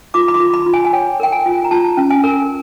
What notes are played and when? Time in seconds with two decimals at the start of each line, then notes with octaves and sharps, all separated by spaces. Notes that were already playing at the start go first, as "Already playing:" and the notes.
0.14 F4 D6
0.28 B5
0.34 C6
0.40 F4
0.54 B5
0.66 F4
0.74 G#5
0.85 G#5
0.93 C#5 G5
1.20 A#4 G5
1.32 G#5
1.46 F4
1.64 A#5
1.71 F4 A5
1.97 C#4
2.10 G#5
2.24 A#4